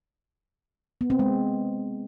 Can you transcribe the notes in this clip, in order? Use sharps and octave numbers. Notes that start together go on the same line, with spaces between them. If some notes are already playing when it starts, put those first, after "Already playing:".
B3
C4
G#3